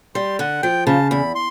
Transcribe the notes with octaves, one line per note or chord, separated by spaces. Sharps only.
G3 C6
D3 F#5
F3 G5
C#3 A5
E2 B5
C6